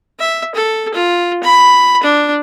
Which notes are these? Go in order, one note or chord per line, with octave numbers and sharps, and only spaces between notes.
E5
A4
F4
B5
D4